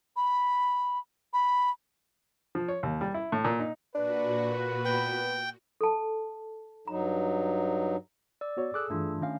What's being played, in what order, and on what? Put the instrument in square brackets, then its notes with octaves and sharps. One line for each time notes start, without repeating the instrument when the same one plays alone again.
[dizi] B5
B5
[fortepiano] F3
C#5
D#2
G3
E4
A2
A#2
D#4
[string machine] A#2 F#4 [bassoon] D4 [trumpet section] B4
[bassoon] B3 [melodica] G5
[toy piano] A4 A5
[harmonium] G2 F#3 D#4 [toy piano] A#5
[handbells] D5 E6
[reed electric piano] B3 F#4 C#5
[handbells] G#4 A4 E6 [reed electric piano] D6 F#6
[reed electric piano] G2 E3 [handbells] A3 D4 F4
[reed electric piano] D#3 F5 [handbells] A3 C#4 D4